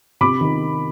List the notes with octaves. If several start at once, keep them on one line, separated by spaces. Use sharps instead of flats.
C3 B5 D6
D#3